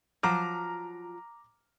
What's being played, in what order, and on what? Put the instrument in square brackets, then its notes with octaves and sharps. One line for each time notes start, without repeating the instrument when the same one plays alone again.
[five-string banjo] F3 F#3 [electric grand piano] A#5 D6 F6